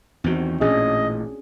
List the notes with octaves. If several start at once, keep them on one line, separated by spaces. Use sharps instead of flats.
E2 D#3 C4 F#4
A1 A#2 C#4 D4 G#4 D#5